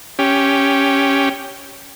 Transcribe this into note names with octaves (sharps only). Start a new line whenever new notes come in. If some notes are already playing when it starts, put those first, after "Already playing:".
C#4 G4